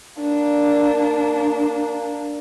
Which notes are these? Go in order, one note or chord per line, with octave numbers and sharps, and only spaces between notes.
A#3 D4